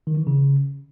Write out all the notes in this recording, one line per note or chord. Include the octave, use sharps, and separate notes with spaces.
D#3
E3
C#3